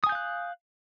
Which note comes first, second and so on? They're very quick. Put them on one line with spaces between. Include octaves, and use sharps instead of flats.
D#6 G#5 G6 F5 F#6